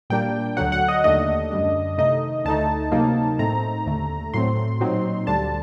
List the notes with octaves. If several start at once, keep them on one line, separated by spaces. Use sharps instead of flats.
A#2 G3 A#3 D4 G5
D2 D3 F#3 F#5
F#5
D#5
D#2 D3 A3 D4 D#5
F#2 D3 G3 D4
C3 D#3 A3 D#4 D#5
D2 D3 A3 D#4 A5
C3 F#3 A#3 D#4
A2 A3 C4 D#4 A#5
D#2 D3 A3
A2 F#3 A3 C4 C6
A#2 F#3 C4 D#4
D2 D3 G3 D4 A5